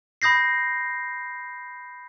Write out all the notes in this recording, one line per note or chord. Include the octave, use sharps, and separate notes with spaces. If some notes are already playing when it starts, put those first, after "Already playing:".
B5 D#6 G6 A#6 C7